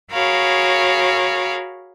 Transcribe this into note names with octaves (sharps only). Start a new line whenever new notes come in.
F#4 G#4 A#4 C#5 F5 B5